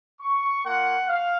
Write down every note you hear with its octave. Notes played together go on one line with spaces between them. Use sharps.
C#6
A#3 F4 F#5
F5